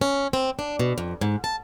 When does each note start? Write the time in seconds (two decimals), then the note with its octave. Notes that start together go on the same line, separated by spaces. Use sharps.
0.01 C#4
0.33 C4
0.59 D4
0.79 B2
0.98 F2
1.21 G#2
1.44 A5